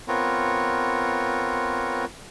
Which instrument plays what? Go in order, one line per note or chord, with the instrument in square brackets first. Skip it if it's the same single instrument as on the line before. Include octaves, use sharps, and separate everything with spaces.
[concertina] B3 C4 F4 A#4 C#5